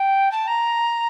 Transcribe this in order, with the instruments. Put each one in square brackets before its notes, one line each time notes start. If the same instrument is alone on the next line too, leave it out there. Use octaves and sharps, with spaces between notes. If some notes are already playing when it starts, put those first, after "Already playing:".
Already playing: [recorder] G5
A5
A#5